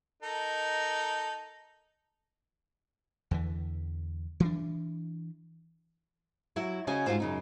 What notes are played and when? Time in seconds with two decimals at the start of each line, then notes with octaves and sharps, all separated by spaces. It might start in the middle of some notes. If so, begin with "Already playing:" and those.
0.23 D#4 A4 A#4
3.31 E2 D3 E3
4.40 E3 D4
6.56 F#3 E4 F#4
6.87 C#3 C#4 F#4 D#5 G#5
7.06 G#2 D3 F4 F#4 C5
7.20 F#2 C#3 D#4